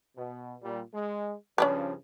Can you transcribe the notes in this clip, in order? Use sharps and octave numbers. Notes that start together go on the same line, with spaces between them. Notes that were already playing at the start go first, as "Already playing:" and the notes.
B2
A#2 G3
G#3
G2 C#3 F3 C#4 D4 B4